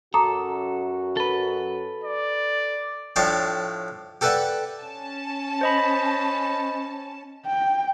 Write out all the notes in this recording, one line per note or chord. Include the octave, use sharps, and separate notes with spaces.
F#2 F#4 A4 A#5 D6 D#6
A4 B4
D5
A2 F3 D4 C#5 D5 G5
G4 A4 B4 D5 E5 F#5
C#4 A5
C5 D#5 B5
G5